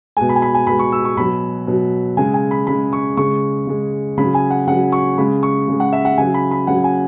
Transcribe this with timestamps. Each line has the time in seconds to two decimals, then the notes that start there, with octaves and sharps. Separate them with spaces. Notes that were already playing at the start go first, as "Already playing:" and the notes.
0.17 B2 G#3 G#5
0.29 B5
0.36 G#5
0.42 B5
0.54 G#5
0.67 B2 G#3 B5
0.79 C#6
0.92 E6
1.05 C#6
1.17 B2 F#3 B5
1.67 B2 F#3
2.17 C#3 G#3 G#5
2.34 G#5
2.51 B5
2.67 C#3 G#3 B5
2.93 C#6
3.17 C#3 G#3 C#6
3.67 C#3 G#3
4.18 C#3 F#3 B5
4.34 G#5
4.50 F#5
4.67 C#3 F#3 F#5
4.92 C#6
5.18 C#3 G#3 B5
5.43 C#6
5.68 C#3 G#3
5.80 F#5
5.93 E5
6.05 F#5
6.18 C#3 F#3 G#5
6.34 B5
6.51 B5
6.67 C#3 F#3 F#5
6.84 G#5